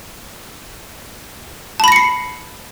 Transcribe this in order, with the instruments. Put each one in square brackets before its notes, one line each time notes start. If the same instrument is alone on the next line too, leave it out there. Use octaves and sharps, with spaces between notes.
[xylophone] A5
B5
A#6
C#7
C7